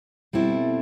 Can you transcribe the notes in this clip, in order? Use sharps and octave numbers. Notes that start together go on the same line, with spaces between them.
B2 G3 C4 E4 A4